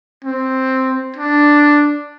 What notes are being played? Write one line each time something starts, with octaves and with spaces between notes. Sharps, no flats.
C4
D4